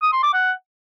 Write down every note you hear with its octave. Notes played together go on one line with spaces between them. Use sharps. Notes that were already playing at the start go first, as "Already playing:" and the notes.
D#6
C6
D6
F#5